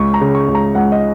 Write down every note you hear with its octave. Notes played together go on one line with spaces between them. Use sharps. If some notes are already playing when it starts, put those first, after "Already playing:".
Already playing: C#2 C#6
A#5
C#3
C#6
C#2
A#5
C#2 F#5
D#5